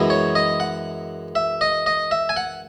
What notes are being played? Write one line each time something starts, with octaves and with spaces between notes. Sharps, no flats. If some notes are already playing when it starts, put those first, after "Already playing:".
Already playing: F#2 E3 G#3 B3 E4
C#5
D#5
F#5
E5
D#5
D#5
E5
G#5
F#5